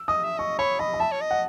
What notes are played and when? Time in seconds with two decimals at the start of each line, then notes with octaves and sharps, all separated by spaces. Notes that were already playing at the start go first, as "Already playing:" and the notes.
Already playing: E6
0.08 D#5 D#6
0.24 E5
0.38 D#5 C#6
0.59 C#5 B5
0.79 D#5 B5
0.94 B5
1.00 E5 A5
1.12 C#5
1.21 D#5
1.31 F#5